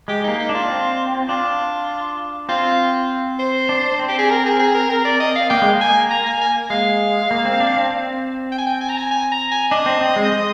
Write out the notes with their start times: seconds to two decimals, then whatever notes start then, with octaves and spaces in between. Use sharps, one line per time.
0.08 G#3 G4
0.24 A#3 D#4
0.39 D#4
0.49 D4 F4
0.69 C4
1.29 D4 F4
2.49 C4 F4
3.39 C5
3.69 D4
3.99 C4
4.09 G4
4.18 G#4
4.30 A#4
4.45 G#4
4.59 G#4
4.74 A#4
4.90 A#4
5.05 D5
5.20 D#5
5.35 F5
5.50 A#3 G5
5.62 G#3
5.73 A#3
5.81 G#5
6.11 A#5
6.26 G#5
6.41 G#5
6.70 G#3 F5
7.31 A#3
7.45 C4
7.60 D4
7.77 C4
7.90 C4
8.51 G5
8.58 G#5
8.66 G5
8.81 G#5
8.89 A#5
8.98 G#5
9.11 G#5
9.32 A#5
9.51 G#5
9.71 D4 D#5
9.86 C4
10.01 C4
10.16 G#3
10.32 G#3